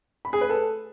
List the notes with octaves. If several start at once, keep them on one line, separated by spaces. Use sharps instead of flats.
B5
G#4
B4
A4